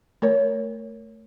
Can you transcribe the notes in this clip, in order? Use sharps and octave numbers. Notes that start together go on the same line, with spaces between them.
A3 A#4 C#5